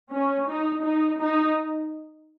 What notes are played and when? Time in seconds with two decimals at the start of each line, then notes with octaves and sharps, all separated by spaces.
0.12 C#4
0.47 D#4
0.84 D#4
1.20 D#4